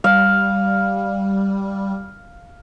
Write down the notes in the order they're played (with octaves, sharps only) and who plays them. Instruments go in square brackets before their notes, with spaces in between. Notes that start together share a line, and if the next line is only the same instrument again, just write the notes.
[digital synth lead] G3 [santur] F5